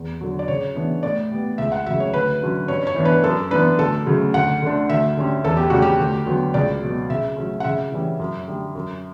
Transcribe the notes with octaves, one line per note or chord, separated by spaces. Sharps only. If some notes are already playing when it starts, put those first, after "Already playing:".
Already playing: E2
D3 F#3
D5
C#3 C#5
E3 B3 D4
A2 D5
G3 B3
C#2 E5
F#5
C#3 F#3 E5
C#5
D2 B4
D3 F#3 C#4
G2 C#5
C#5
E3 B3 D4
B4
F#2 A4
E3 B3 D4 B4
D2 A4
C#3 F#3 A3
D2 F#5
D3 A3 D4
D2 E5
D3 G3 C#4
E2 A4
G4
C#3 G3 C#4 F#4
G4
D2
D3 F#3 B3
C#2 D5
B2 F#3
C#3 E5
F#3 A3 C#4
F#5
C#3 E5
E3 G3 C#4
F#2
D3 G3
F#2